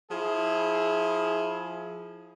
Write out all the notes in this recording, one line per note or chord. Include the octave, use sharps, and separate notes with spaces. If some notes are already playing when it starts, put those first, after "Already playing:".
F3 E4 G#4